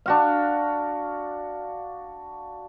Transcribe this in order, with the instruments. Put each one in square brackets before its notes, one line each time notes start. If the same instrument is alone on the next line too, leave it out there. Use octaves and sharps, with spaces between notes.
[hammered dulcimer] D4 F#4 F5